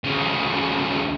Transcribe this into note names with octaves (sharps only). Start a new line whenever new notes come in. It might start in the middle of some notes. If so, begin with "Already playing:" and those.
D2 C#3